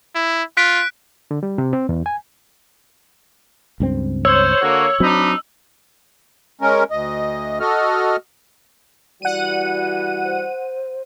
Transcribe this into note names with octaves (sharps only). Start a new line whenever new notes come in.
E4
F4 F#6 B6 D7
D3
G3
C3
C4
E2
G#5
C#2 G2 C4
C5 C#5 E6
D3 A#3 F#4
F#3 C4 D4 D#4 B5
G#3 C#4 A#4
D2 D#5
F#4 A4 D#5 F6
E3 G3 F#4 D5 F#5 D#7
C5